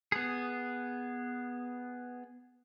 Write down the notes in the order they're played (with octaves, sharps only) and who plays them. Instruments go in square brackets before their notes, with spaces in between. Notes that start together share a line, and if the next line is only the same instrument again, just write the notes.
[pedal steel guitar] B3 G#4